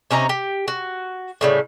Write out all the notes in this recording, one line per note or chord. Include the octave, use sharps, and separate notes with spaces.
C3 C#4 D#4 A#5
G4
F#4
A2 C#3 G3